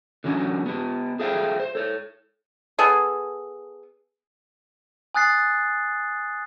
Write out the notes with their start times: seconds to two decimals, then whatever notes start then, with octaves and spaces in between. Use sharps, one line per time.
0.24 D3 E3 F#3 C#4
0.66 B3 G4
1.19 G#4 A4 C5 E5 F5 G5
1.60 C5
1.75 A4 C#5
2.78 B3 G#4 A4
5.15 G#5 D#6 F#6 A6 C7